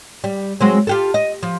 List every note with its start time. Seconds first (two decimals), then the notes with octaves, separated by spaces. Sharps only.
0.24 G3
0.61 F#3 G#3 C4
0.87 F4 G4 A4
1.14 D#5
1.43 F3